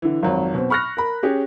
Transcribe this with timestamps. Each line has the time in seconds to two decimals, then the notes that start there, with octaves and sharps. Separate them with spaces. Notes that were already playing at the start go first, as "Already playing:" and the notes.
0.02 D3 E3
0.23 G#1 F2 F#3
0.54 B2 C4
0.70 B5 C#6 F6 F#6 A#6
0.97 A#4 B5
1.23 C#4 G4 G#4